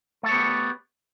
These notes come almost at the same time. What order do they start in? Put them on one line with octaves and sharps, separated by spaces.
A3 A4 C#5 B3 G4